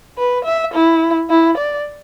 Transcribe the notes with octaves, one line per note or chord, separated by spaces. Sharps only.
B4
E5
E4
E4
D5